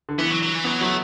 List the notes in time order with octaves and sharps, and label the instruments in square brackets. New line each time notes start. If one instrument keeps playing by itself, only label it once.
[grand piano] D3
[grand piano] E3 [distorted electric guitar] B3
[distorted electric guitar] F#3
F#3
E3
[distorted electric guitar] F#3 [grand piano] B3
[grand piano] F#3 [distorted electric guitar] A3